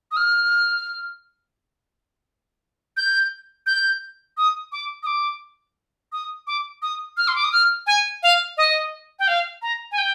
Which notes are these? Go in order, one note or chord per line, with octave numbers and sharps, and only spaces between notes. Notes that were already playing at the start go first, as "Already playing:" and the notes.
D#6
F6
G6
G6
D#6
D6
D#6
D6
D#6
D6
D#6
F6
C6
D6
D#6
F6
G#5
F5
D#5
G5
F5
A#5
G#5
G5